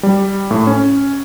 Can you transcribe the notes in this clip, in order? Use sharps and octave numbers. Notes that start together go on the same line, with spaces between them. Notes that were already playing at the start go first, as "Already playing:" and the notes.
G3
A2
C#4